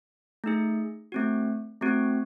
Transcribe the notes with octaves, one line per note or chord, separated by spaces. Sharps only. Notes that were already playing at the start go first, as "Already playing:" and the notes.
A3 D#4 G#4
A3 C4 F#4
A3 C4 F#4